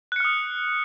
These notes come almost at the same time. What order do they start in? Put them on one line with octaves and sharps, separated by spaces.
F#6 C#7 F6 D#6